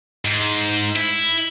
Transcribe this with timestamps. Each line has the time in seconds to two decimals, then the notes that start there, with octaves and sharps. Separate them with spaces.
0.25 G#2
0.96 E4